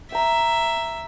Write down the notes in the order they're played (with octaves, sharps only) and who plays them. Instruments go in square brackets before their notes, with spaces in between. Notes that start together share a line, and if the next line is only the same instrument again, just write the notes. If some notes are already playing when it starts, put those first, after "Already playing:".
[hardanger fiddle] E5 [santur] G5 A#5